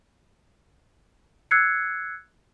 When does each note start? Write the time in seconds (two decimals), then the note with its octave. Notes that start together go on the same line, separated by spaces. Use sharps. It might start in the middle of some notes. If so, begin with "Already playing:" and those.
1.51 E6 F#6 G#6 C7 C#7